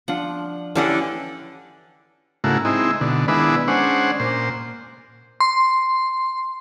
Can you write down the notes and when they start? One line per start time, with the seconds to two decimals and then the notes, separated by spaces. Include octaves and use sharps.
0.08 F3 D4 F4 F#5
0.75 D3 E3 C#4 G4 A4 F#5
2.44 G#2 C#3 A3 A#3 E4 F#4
2.65 G#3 C4 D#4 E4
3.01 B2 D3
3.28 D#3 G#3 B3 D4 E4 B4
3.68 G#3 C#4 D4 C5 F#5
4.20 A#2 C5
5.40 C6